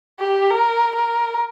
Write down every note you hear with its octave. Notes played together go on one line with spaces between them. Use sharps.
G4
A#4
A#4